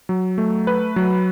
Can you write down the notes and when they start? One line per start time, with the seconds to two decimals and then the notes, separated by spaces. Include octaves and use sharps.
0.09 F#3
0.38 A3
0.67 B4
0.96 F#3